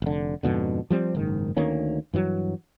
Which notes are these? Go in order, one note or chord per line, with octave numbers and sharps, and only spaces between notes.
F1 D3
F2 G#2 B2 D3
F3 G3 C4
F#1 G#2 D#3
D2 D#3 A#3 C#4
G2 E3 F#3